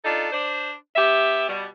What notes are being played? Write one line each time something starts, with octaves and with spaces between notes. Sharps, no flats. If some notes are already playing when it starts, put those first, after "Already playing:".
D4 D#4 F4 A4
D4 C5
B3 G4 E5
B2 G3